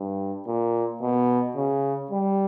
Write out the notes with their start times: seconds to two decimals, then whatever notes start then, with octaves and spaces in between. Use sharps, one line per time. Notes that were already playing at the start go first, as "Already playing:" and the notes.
Already playing: G2
0.47 A#2
1.02 B2
1.56 C#3
2.11 G3